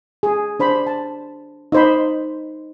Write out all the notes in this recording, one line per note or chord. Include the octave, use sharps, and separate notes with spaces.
G#4
D4 C5 B5
A5
D#4 C5 B5